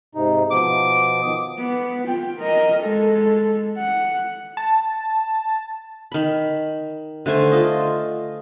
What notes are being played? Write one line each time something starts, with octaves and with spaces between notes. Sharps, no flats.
G#2 C3 D#4
B2 F3 B3 D6
D#3 D#6
B3
F4 G5
A#4 D#5
G#3 A4
F#5
A5
D#3 B5
D3 A3 C5 G#5
F4 D#5